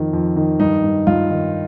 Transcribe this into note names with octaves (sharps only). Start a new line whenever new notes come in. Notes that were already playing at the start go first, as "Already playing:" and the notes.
Already playing: F2 D#3
F2
D#3
G2 D#4
G2
G2 F4
D#3